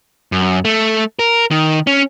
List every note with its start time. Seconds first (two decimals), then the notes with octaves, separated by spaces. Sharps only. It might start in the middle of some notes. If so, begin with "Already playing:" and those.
0.32 F#2
0.65 A3
1.19 A#4
1.51 D#3
1.87 C#4